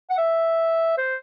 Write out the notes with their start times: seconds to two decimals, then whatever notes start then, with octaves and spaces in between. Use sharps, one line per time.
0.10 F#5
0.18 E5
0.98 C5